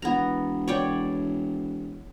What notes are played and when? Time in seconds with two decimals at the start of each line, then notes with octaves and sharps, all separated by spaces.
0.02 E1 B3 A#5
0.68 C#5 D5 G5